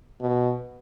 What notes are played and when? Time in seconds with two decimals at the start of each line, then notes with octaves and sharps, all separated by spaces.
0.21 B2